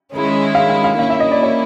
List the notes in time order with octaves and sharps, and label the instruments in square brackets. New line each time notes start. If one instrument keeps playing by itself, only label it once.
[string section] D#3 G#3 C#4 E4
[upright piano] F5
F5
F5
[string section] A#3 C#4 E4 [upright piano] F5
[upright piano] E5
D#5
D5
C#5